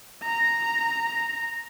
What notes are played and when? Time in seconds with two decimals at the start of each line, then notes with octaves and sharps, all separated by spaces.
0.23 A#5 A#6